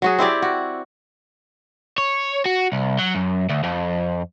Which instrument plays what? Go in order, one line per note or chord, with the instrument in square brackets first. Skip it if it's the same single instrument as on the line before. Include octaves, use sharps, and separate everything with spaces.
[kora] F#3 F#4 G#4
C4 E4 G4 D5
F#4
[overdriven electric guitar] C#5
F#4
C2
F#3
F#2
D2
F2